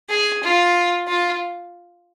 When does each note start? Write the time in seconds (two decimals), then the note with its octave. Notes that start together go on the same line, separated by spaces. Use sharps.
0.09 G#4
0.43 F4
1.07 F4